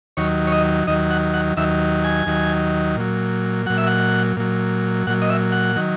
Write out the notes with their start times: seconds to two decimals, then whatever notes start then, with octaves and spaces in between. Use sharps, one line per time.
0.17 D#2 D#3 F#3 C#5
0.47 C#5
0.52 D#5
0.87 D#2 D#3 F#3 D#5
1.11 F#5
1.34 F#5
1.57 D#2 D#3 F#3 E5
2.04 G#5
2.26 D#2 D#3 F#3
2.97 A#2 F#3
3.66 A#2 F#3 F#5
3.78 E5
3.87 F#5
4.37 A#2 F#3
5.07 A#2 F#3 F#5
5.21 D#5
5.30 E5
5.52 F#5
5.76 D#3 F#3